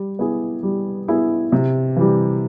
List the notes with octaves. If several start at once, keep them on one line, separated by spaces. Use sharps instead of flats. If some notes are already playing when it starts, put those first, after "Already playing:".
Already playing: G3
B3 E4 G#4
G3
B3 E4 G#4
C3
E3 G3